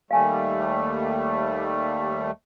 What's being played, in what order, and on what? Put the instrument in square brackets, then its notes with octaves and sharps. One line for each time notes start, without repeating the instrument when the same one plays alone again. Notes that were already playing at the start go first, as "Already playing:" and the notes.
[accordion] D#2 G3 A3 [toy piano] F5 G#5 A5